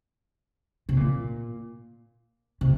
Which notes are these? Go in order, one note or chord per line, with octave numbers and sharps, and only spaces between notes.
C3
A#2
C3